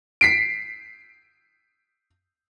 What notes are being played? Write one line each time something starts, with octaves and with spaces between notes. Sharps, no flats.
B6 C7 D7